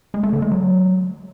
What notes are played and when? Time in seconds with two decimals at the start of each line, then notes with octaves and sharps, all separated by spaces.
0.14 G#3
0.23 A3
0.33 D3
0.42 G#3
0.52 F#3